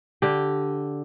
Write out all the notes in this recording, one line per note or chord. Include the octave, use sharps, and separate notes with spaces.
D3 G4